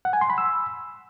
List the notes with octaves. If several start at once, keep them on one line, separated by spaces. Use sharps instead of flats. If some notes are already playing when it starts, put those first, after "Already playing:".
F#5
G#5
C6
B5
E6